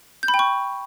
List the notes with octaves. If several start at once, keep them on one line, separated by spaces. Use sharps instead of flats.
G6
B5
G5
C#6